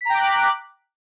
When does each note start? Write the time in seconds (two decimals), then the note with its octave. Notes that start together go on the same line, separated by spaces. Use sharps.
0.01 B6
0.05 A#5
0.10 G5
0.14 D6
0.18 F#6